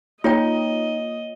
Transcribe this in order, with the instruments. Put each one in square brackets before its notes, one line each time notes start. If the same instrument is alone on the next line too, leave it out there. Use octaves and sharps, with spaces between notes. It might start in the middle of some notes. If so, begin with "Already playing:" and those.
[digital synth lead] A#3 [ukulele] D#4 [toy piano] F4 C#5 G5 [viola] D#5